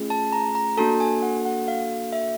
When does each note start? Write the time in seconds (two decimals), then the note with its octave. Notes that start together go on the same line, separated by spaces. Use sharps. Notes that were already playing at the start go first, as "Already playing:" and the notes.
Already playing: A3 C#4 F4 G#4
0.10 A5
0.32 A#5
0.55 A#5
0.77 A#3 D4 F#4 A4 A5
1.00 G#5
1.22 F#5
1.45 F#5
1.68 F5
2.13 E5